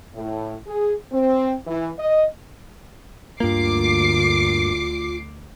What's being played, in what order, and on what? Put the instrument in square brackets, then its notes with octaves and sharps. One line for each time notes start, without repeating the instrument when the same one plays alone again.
[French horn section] A2
G#4
C4
E3
D#5
[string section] D2 D6 C7 [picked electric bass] G2 A#3 [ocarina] F4